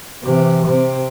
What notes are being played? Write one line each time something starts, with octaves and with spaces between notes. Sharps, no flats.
C3 E3
C3 C4